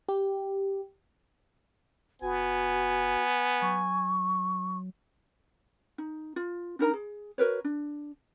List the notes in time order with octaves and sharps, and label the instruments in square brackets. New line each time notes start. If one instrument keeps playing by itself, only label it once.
[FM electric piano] G4
[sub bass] F#1 [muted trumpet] B3 [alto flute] F#4 [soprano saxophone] G#5
[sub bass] F#3 [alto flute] C#6
[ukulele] D#4
F4
D4 D#4 A#4 A#5
G#4
F#4 A#4 B4 C#5
D4